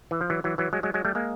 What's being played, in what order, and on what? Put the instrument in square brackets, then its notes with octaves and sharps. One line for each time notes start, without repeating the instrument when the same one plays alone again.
[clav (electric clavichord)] E3
F3
E3 F#3
E3 F#3
E3 F#3
F#3 G#3
F#3 G#3
F#3 G#3
G3 A3
G#3 A#3